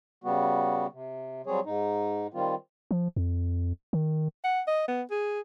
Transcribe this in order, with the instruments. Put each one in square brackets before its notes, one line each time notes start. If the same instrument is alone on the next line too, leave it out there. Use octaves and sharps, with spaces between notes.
[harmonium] C#3 G3 B3 F#4
C3
F#3 G3 C4 G#4 C#5
G#2 D#4
D#3 G3 C4 F4
[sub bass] F3
F2
D#3
[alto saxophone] F#5
D#5
B3
G#4